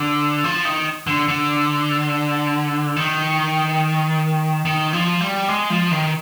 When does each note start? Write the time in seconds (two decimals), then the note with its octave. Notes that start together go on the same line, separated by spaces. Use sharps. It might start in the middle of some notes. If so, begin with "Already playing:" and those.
Already playing: D3
0.44 F3
0.65 D#3
1.07 D3
1.28 D3
2.96 D#3
4.65 D#3
4.93 F3
5.21 G3
5.49 G#3
5.70 F3
5.91 D#3